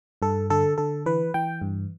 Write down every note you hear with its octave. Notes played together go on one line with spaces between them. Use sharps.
G2 A4
D3 A4
D3 A4
E3 B4
E3 G5
G2